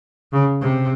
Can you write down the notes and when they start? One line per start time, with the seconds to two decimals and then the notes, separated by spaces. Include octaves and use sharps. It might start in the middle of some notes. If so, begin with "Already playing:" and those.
0.32 C#3
0.61 C3